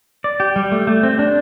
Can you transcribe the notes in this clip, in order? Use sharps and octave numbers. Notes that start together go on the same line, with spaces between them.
D5
G4
G3
A3
A3
C4
D4